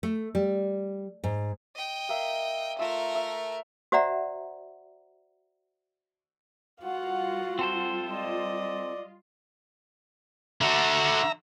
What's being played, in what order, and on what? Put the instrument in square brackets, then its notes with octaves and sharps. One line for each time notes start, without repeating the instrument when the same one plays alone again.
[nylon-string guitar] A3
G3
G#2
[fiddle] D#5 G5
[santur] A#3 E5 F5
[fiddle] A3 A#4 [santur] F4 E5
[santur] E5
[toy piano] F#4 C5 D5 E5 F#5 A#5
[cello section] G3 F4 [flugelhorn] F#4 [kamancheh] F5 F#5
[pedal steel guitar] C4 A4 C5
[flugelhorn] D5 [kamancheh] D#5
[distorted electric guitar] D3 F#4 [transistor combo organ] E5 A#5